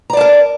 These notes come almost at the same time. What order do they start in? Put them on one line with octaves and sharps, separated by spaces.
A#5 D5 A5 A#4